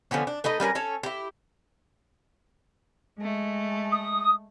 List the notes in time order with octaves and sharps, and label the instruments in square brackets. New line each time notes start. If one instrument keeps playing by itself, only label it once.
[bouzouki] D3 F3 B3 C#4
D4
A3 D#4 B4 D#5
G3 C#4 A#4 B4
C#4 A4 C#5
E4 G4
[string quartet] G#3 A3
[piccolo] D#6